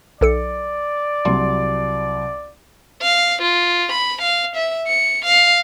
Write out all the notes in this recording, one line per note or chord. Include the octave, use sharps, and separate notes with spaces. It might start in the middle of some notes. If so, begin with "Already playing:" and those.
B1 A4 D5 C#7
C2 F#3 G3 C6
F5
F4
B5
F5
E5
C#7
F5